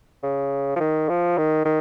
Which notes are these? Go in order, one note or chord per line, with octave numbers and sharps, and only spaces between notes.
C#3
F3
D#3
F3
D#3
D#3